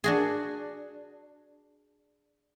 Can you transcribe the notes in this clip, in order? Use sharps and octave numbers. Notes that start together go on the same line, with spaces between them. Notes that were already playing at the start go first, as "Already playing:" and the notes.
D4 F#4 G#4